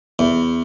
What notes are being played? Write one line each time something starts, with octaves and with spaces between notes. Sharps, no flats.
E2